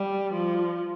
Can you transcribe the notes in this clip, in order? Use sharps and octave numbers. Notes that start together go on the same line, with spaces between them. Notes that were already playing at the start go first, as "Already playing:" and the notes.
Already playing: G3
F3